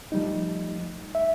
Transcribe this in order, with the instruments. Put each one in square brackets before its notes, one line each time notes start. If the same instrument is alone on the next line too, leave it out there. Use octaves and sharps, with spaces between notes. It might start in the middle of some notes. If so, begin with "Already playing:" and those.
[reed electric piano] F3 G3 A3 D#4
E5